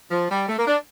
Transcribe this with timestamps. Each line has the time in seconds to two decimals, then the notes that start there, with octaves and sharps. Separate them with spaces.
0.11 F3
0.31 G3
0.48 A3
0.58 A#3
0.67 D4